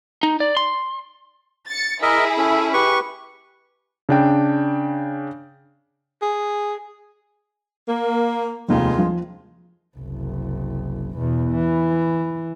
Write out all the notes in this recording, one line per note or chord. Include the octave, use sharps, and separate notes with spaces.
D#4
D5
C6
A6 C#7
E4 G#4 A#4 D#5 E5
C#4 A4 E5
G4 B4 C#6
C#3 D4 G5
G#4
A#3
F1 D#2 D#3 G#3 F4
F3
F#1 C2
E2 B2
E3